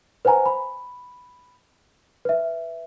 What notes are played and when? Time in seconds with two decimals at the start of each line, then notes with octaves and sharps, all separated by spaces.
0.25 B4 C5 F#5 G#5 A#5
0.46 B5
2.25 B4 E5